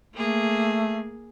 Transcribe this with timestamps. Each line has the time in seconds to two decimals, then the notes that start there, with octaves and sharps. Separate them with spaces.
0.14 A3 A#3 G#4